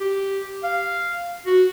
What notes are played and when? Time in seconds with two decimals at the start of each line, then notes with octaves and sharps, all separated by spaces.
0.01 G4
0.64 F5
1.46 F#4